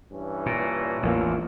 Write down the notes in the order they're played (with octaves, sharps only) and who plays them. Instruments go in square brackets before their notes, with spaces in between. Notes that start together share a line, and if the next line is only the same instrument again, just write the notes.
[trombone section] G2 E3 C#4
[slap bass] A#2
[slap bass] A1 E2 [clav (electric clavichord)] F3 A#3